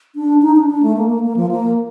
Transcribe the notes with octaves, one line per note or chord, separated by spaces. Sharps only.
D4
D#4
D4
D4
A3
A#3
A#3
A#3
F3
A#3